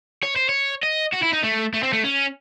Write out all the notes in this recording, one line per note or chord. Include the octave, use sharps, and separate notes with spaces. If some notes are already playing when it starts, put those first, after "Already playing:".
C#5
C5
C#5
D#5
F#4
E4
D#4
A3
A3
C4
A3
C#4